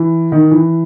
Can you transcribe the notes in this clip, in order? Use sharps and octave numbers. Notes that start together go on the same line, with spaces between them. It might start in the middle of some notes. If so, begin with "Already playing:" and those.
Already playing: E3
D#3
E3